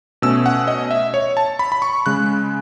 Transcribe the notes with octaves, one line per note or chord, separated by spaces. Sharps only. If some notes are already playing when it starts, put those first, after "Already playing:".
B2 A3 C#4 E6
F#5
D#5
E5
C#5
A5
B5
B5
C#6
C#3 G#3 F#6